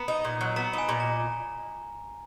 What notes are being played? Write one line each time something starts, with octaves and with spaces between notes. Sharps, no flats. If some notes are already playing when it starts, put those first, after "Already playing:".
Already playing: B3 A#5
D#4
A#2
F#3
B3 A#5
D#4 G#5
A#2
A#5